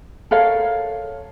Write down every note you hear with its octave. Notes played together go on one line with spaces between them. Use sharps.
A4 A#4 C#5 F5